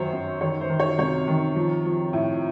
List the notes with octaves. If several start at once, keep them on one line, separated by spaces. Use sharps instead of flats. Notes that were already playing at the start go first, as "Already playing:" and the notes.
Already playing: F#2 D#3 F#3 C5 C#5
F#2
D#3 C#5
C5
D#3
C#5
C3 C#5
D#3
F3
F3
A2